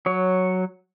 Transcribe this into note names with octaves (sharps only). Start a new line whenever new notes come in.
F#3 C#5